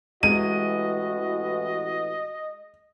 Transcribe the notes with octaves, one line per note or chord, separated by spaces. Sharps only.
A1 E3 G#3 F#4 D#5 D#7